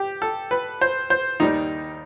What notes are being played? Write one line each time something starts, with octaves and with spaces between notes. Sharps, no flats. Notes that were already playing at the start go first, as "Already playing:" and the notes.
Already playing: G4
A4
B4
C5
C5
D#2 D#3 G3 D#4